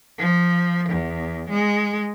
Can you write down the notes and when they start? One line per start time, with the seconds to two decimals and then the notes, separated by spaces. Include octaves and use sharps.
0.19 F3
0.89 E2
1.50 G#3